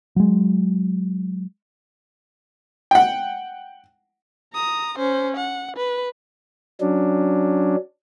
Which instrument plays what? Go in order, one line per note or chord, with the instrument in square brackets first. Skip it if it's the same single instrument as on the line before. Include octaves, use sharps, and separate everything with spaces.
[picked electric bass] F#3 G#3
[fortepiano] F#5 G5
[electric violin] A#5 D#6
C#4 C5
F#5
B4
[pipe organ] F#3 C#4 D4